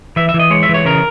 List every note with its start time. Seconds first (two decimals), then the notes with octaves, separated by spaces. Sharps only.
0.16 E3 E5
0.29 E5
0.34 E3
0.40 D#5
0.50 G#3 C#5
0.63 E5
0.69 E3
0.74 C#5
0.85 C#3 A#4